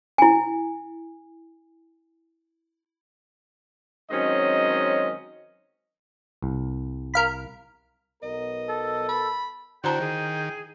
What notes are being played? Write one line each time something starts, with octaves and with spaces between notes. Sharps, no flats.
E4 G#5
D#3 F#3 G#3 C4 C#4 D#5
C2
A#4 F5 B5
B1 B3 A#4 D#5
A4
B5
D3 E4 F#4 C5 G5 A5 A#5
D#3 G#4